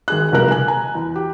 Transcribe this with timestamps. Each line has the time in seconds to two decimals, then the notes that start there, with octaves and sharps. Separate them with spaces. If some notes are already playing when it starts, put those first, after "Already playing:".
0.08 G#1 G#4 F#6
0.32 F1 C#2 B2 G3 A#4 F#6
0.51 G#5 F#6
0.68 G#5 A#5
0.95 E2
1.15 G4